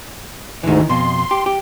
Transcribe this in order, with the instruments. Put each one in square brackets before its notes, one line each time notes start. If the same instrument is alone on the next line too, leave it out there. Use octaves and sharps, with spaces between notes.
[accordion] D2 G#2 [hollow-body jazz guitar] D#3 E3
[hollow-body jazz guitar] F2 B2 [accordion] C6
[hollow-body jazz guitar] G4
G4